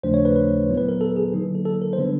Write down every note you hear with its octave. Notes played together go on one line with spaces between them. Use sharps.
D#2 C#3 F3 A3 D4 C5
C#5
B4
B4
A#2 F#3 B3 E4
B4
A#4
A4
G#4
D3 F#3 A#3 D#4
A4
A4
A#4
C5
D3 G3 B3 D4 B4